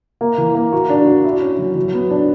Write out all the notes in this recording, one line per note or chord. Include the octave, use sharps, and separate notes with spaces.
A#3
E3
A#3
F#4
D4
F#4
E4
C#4
F#3
F#3
B3
D4